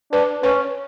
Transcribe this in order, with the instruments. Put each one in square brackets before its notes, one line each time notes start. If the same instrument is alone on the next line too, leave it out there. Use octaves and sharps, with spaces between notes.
[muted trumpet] D4 [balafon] B4
[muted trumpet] C#4 [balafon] B4